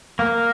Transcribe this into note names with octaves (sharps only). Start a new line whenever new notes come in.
A#3